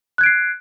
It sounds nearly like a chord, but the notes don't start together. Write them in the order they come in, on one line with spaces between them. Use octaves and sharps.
F#6 G#6 D7 C7